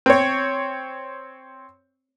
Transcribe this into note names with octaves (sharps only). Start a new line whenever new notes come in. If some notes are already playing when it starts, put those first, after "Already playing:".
C4 C#5